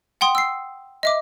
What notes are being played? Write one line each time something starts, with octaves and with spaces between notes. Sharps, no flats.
F#5 G5 C6 D#6
E6 C7
D#5 E5 D6